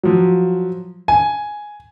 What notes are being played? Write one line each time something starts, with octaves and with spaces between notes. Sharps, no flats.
F3 F#3
G#5